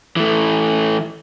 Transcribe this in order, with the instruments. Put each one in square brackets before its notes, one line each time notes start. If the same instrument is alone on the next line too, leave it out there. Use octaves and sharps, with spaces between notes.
[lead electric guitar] E3 A3